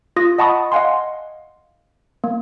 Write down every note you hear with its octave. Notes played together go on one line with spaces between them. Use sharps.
F4 D#6 A#6
D#5 F#5 A5 B5 C#6 D#6
D#5 F5 F#5 G#5 C6
A#3